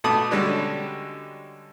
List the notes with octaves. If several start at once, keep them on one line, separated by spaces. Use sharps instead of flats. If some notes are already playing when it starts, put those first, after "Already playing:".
B2 A3 A5 B5 D6 D#6
D3 G3 G#3 C#4 D4 F#4